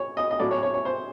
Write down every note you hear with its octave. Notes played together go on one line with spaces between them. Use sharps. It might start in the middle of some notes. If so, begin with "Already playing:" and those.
Already playing: C#5
D#5
D#5
A2 F#3 A3 D5
C#5
C#5
C#5
C5